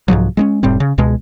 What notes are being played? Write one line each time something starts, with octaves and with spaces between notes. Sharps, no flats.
C2 G#2 F3 F#3
G#3 B3 C#4
F1 A2 G3 C4
C#3
C#2 B2 G#3